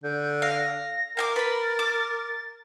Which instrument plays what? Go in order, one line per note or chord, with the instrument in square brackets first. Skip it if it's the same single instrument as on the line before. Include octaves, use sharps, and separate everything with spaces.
[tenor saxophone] D3 [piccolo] G6
[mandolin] F5 [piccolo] A#6
[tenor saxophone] A#4 [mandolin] F5 G#5 D6
[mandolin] B4 B5 [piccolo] A6
[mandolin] D6